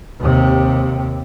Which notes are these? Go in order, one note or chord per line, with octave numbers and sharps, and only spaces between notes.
D#2 C3